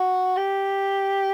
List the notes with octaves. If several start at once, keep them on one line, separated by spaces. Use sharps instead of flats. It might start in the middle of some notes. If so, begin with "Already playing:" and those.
Already playing: F#4
G4